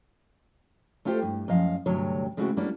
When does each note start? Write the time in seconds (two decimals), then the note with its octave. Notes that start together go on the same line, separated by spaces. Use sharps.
1.05 A3 E4 F4 G4 A4 C5
1.22 G2
1.48 F#2 F3 D#5 F5
1.86 D2 G2 C3 F#3 C#5
2.37 C#3 G#3 A3 C4 E4 F#4
2.57 G3 A#3 B3 C#4 D4